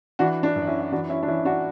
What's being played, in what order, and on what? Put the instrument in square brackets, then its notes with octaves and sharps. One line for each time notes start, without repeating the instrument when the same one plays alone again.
[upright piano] E3 D4 F#4
D4
F#2
C#4 E4
E4
E3 D4 F#4
C#4 E4
D4
E3 C#4 E4
D4 F#4